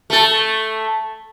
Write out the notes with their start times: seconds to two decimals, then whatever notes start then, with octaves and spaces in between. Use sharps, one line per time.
0.10 A3 A4